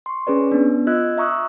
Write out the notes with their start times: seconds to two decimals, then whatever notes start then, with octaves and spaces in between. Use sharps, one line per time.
0.06 C6 C#6
0.27 C#4 G#4 B4 D5
0.52 B3 D4
0.87 F4 D#5 E6 F#6 G#6
1.18 E5 A#5 C#6 D#6 E6 F#6